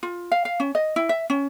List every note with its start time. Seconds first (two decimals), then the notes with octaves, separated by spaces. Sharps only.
0.03 F4
0.32 F5
0.45 F5
0.60 C#4
0.75 D#5
0.96 E4
1.09 E5
1.30 C#4